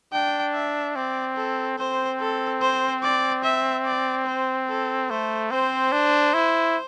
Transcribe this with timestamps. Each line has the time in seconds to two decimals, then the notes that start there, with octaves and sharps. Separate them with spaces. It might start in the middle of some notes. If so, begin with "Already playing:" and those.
0.13 D4 G5
0.54 E5
0.96 C4 D5
1.37 A4
1.79 C4 C5
2.20 A4
2.61 C5
3.03 D5
3.44 E5
3.86 D5
4.27 C5
4.68 A4
5.09 A3 C5
5.51 C4 C5
5.92 D4
6.33 E4